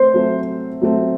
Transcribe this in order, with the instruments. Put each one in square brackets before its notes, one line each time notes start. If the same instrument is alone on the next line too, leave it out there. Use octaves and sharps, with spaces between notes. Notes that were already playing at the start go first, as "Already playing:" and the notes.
Already playing: [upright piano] A3 C4 [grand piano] C5
[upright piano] F#3 A3 C4
F#3 A3 C4